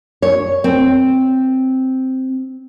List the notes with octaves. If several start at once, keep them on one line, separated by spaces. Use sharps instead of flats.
C#5
C4